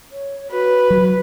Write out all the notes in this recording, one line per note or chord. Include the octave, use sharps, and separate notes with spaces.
C#5
F#4 B4
F#3